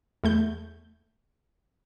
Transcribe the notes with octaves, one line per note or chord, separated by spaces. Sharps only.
E2 A3 G6